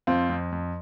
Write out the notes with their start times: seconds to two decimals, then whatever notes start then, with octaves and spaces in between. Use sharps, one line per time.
0.07 F2 C4 F4
0.29 F2
0.52 F2